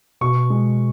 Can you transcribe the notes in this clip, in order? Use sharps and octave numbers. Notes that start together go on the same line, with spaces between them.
B2 C#6
G#3